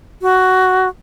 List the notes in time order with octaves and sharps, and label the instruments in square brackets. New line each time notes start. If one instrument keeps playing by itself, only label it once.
[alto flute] F#4